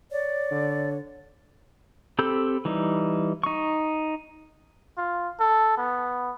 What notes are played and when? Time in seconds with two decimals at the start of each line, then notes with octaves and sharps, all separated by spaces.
0.11 C#5 D5
0.51 D3
2.19 C4 G4 A4 B5 G6
2.65 E3 G3 D#4
3.44 D#4 C#6
4.97 F4
5.40 A4
5.77 B3